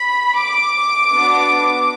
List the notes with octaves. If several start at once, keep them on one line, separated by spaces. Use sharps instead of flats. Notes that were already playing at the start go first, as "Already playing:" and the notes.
Already playing: B5
D6
B3 D4 F#4